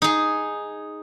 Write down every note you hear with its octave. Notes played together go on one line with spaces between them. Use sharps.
D#4 G#4